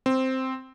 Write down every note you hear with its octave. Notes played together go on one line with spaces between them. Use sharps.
C4